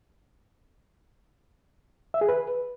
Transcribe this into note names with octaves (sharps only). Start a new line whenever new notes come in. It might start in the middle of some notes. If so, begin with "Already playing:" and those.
E5
G#4
B4